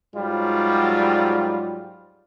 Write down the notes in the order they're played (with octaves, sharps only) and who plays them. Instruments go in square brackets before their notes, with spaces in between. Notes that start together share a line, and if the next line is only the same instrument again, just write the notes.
[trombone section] G#2 F#3 G3 F4